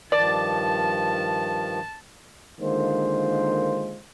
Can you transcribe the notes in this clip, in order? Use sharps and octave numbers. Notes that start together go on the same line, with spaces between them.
G2 D#3 F3 D5 A5
D3 D#3 G#3 A#3 F4 C5